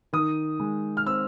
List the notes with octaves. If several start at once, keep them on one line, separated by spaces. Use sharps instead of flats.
D#3 D#6
G#3
F6
C4 E6